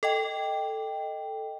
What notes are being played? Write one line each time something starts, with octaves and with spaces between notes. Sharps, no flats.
A4 D#5 G5